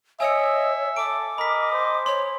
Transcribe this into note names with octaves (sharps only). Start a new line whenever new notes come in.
C#5 D#5 E5 G#5 E6 C#7
A4 D6 D7
A#4 D#5 B5 B6
C5
C#5 C6